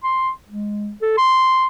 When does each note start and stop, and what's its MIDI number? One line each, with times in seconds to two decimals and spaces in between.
0.03 0.30 84
0.48 0.92 56
1.02 1.18 69
1.18 1.67 84